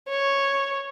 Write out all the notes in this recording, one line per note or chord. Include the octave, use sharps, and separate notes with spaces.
C#5